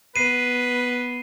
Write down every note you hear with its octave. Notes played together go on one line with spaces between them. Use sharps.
B3 B4 C7 D#7